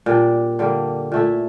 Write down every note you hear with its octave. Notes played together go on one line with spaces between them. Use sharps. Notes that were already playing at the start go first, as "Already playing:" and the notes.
A#2 G3 D4
D3 G3 A#3
A#2 A3 E4